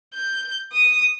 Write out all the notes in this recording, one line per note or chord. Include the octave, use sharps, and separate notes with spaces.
G6
D#6